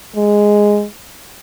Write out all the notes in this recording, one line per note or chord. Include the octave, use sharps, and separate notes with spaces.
G#3